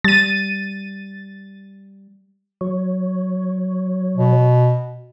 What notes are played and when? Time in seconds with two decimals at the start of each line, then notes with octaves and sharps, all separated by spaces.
0.04 G3 A6 D#7
2.61 F#3 C#5
4.16 B2